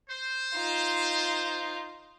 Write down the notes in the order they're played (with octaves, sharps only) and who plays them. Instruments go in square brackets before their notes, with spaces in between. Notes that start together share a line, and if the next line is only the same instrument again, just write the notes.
[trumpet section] C5
[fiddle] D#4 F4